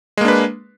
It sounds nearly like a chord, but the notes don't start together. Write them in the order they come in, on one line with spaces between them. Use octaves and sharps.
G#3 A#3 D4 B4